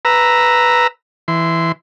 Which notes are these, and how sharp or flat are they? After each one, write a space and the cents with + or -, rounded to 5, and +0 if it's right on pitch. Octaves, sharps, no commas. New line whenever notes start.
B4 +0 A#5 +0 E6 +0
E3 +0 C6 -20